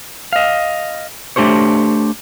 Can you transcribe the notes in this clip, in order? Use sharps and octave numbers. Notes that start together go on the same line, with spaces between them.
D#5 F5
A3 D4 G4 C5 C#5